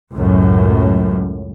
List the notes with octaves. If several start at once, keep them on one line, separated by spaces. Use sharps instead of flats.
C#2 F#2 A2